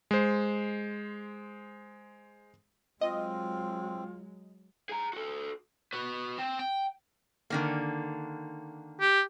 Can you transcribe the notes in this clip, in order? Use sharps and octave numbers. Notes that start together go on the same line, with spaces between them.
G#3 C5
F#3 G#3 C4 F4 D#5
G#4 A#5
F#4 A4
F#4 B4
C4
G5
D3 D#3 A#3
G4